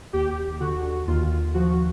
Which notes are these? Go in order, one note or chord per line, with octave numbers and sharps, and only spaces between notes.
D#2 G4
D3 F#4
D#2 F4
F3 F#4